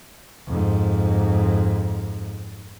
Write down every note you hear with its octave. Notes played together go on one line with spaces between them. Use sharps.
F2 G#2